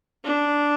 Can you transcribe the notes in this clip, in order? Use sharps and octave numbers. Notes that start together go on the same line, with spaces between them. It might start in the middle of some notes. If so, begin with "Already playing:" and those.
D4